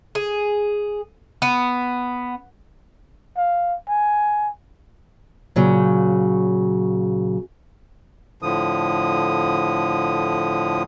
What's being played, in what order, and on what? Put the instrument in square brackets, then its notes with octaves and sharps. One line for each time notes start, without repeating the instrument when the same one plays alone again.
[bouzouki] G#4
B3
[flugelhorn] F5
G#5
[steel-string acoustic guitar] A#2 C#3 F#3
[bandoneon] A2 D3 F3 D#6